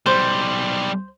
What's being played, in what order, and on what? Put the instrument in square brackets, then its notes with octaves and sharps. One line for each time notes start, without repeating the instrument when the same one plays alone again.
[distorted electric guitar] B1 G3 [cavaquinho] C5